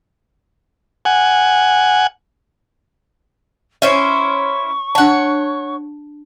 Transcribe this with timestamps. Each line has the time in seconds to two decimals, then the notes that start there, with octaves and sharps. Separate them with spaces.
1.05 F#5 G#5
3.82 C#4 E4 C5 C#5 E5 C#6
4.95 D4 C#5 F#5 A5